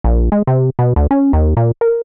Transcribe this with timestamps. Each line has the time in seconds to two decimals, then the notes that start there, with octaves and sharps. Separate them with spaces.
0.04 A#1
0.32 G#3
0.47 C3
0.79 B2
0.96 D2
1.11 C#4
1.33 D#2
1.57 A#2
1.81 A#4